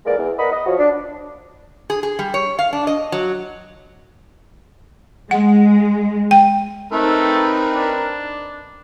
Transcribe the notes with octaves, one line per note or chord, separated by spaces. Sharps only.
E2 G#2 G#3 A#3 A#4 D5
E2
A#4 B4 D5 D#5 F#5 B5
D#5
F3 F#4 C#5
D4
G#4
G#4
G3
C#5
F5
D4
D#5
F#3
G#3 F#5
G5
A3 C4 D#4 A#4 B4 B5
D4